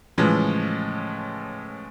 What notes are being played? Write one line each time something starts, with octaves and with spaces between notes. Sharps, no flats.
A2 C#3 E3 F3 G#3